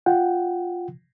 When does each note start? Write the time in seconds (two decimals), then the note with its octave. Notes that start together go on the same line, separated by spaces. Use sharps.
0.06 F4 F#5 G5